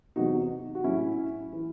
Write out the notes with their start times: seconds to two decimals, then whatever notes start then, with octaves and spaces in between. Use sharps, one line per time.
0.16 E2 C3 F#3 D#4 F#4
0.75 F#4
0.84 A2 F#3 C#4 E4
1.53 E3